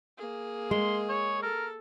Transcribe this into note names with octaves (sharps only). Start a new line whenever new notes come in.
A#3 G#4
G#3 C6
C#5
A4 A#4